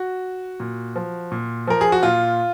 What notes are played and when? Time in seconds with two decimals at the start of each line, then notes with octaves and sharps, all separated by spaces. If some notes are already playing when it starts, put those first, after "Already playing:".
Already playing: F#4
0.60 A#2
0.96 F3
1.32 A#2
1.67 F3 A#4
1.81 G#4
1.92 F#4
2.03 A#2 F4